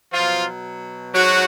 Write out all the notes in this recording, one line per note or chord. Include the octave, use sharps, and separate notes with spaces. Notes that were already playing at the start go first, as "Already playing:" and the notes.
B2 F3 F#3 F4
G#2 F#3 F#4